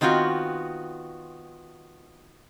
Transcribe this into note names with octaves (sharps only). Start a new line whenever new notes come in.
D#3 B3 C4 F4 F#4